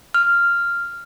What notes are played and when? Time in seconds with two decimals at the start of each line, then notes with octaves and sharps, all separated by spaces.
0.14 F6